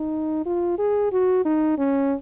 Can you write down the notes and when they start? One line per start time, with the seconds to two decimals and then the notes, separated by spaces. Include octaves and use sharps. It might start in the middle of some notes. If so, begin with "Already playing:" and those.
Already playing: D#4
0.46 F4
0.78 G#4
1.12 F#4
1.45 D#4
1.78 C#4